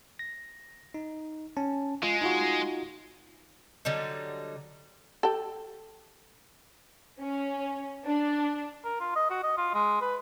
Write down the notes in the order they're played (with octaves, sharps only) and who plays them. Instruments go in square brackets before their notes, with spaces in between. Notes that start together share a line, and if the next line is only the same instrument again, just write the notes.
[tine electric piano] A#6
D#4
C#4 A5
[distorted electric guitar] G#3 [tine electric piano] F4
[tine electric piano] D#4 F4 F#4
[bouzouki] D3 F#3 G3 D#4
[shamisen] G4 A4
[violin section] C#4
D4
[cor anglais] A#4
F4
D#5
F#4
D#5
F4
G#3
B4